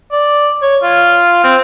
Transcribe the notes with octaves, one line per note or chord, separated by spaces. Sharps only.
D5
C#5
F4
C4